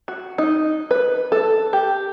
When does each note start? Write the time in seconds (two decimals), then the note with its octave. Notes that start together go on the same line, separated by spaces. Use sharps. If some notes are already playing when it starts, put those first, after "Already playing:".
0.08 F#4
0.38 D#4
0.91 B4
1.32 A4
1.73 G4